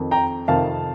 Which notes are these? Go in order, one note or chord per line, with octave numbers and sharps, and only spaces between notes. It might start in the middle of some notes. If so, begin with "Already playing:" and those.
Already playing: F2 D#3
G5 A#5
F2 C3 D#3 F5 A5